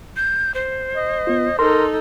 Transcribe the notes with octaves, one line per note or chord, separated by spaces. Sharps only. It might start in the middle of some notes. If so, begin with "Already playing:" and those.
G6
C5
D#5
B3 F4
D#4 A4 A#4 C6